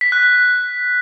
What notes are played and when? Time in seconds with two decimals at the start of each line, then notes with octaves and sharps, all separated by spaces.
0.01 B6
0.12 F#6
0.23 F#6